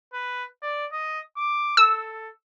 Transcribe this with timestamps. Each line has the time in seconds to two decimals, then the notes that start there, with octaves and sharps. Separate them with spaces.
0.13 B4
0.62 D5
0.92 D#5
1.37 D6
1.77 A4 E6